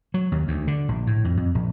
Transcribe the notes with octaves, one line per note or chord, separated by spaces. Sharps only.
F#3
D#2
D2
D3
A#1
A2
F2
F2
A#1